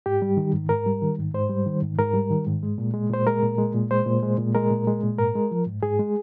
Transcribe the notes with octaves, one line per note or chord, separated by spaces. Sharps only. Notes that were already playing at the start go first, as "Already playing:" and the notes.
G#2 G4
G3
D#3
G#2
G#2 A#4
G3
D#3
G#2
G#2 C5
G3
D#3
G#2
G#2 A#4
G3
D#3
G#2
G#3
A#2
G#3
A#2 C5
G#3 A#4
A#2
G#3
A#2
G#3 C5
A#2
G#3
A#2
G#3 A#4
A#2
G#3
A#2
G#2 A#4
G#3
F3
G#2
G#2 G#4
G#3